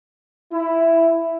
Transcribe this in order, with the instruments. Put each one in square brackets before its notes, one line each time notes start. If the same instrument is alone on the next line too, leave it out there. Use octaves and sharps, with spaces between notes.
[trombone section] E4